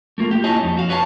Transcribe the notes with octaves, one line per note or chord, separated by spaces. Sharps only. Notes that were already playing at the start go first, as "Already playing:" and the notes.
A3 A#3 F4
G4
D#4 E4 C#5 D#5 G#5 A5
F2
F#4 F5
B4 C#5 F5 G#5 A5